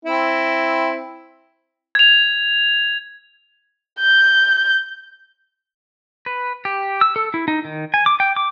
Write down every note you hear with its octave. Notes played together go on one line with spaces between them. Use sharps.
C4 E4
G#6 F7
G6
B4
G4
E6
A4
E4
D#4
D#3
G#5
D6
G5
D6